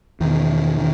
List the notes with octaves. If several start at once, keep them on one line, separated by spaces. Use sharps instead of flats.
E2 B2 D#3
D#3